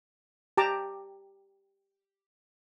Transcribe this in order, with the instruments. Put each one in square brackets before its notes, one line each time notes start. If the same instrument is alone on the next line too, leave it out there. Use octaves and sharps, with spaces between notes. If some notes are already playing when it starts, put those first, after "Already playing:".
[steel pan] G4 A5 A#5 D6